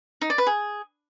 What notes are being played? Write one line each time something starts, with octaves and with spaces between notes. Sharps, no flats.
D#4
D5
B4
G#4